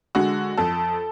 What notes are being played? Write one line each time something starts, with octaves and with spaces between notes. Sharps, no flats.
D3 G#3 F#4
F2 A4